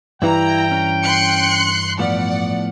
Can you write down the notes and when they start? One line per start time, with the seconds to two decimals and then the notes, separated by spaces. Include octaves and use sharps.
0.22 G2 E3 E4 G5 A#5
0.71 C#4
1.03 C6 F#6 C#7
1.99 A2 F3 B3 D5 F#5